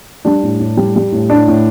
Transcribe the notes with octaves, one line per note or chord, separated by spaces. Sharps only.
G3 D4
A2
A2
G3
G3
A2
A2 D4
A2